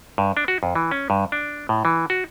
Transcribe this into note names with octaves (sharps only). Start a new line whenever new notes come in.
G2
D4
F#4
F2
E3
C#4
G2
D4
A2
E3
F#4